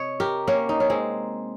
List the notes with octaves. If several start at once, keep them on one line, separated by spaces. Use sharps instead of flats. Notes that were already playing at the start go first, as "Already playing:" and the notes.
Already playing: C3 C#5 D#5
G4 A#4
A#3 C#4
D#4
C#4
G#3 C4